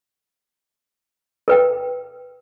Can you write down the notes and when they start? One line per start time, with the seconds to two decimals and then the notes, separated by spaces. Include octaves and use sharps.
1.48 A#4 B4 G5